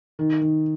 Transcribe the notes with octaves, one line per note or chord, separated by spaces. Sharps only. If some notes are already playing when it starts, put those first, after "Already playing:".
D#3
D#3